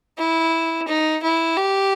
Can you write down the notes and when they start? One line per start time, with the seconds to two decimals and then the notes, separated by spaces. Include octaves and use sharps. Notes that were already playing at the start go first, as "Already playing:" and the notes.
0.18 E4
0.88 D#4
1.23 E4
1.57 G4